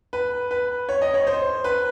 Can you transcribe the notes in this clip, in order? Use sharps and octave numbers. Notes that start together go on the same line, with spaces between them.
B4
B4
C#5
D#5
C#5
C5
B4